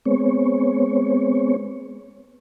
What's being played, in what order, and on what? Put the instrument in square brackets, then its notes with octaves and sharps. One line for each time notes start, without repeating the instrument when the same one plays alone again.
[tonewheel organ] G#3 B3 C4 C#5